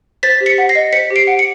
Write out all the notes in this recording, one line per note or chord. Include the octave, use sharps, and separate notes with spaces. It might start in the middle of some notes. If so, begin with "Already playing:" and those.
C5 A6 B6
G4
B6 C#7
F#5
A#6 C7
D#5
C5 B6 C#7
G4
C7 D7
F#5
C#7